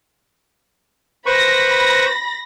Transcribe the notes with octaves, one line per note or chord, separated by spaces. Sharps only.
B4 C5 B5 C#6 A#6